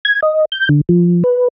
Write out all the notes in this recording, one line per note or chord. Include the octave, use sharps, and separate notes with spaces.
G#6
D#5
G6
D3
F3
B4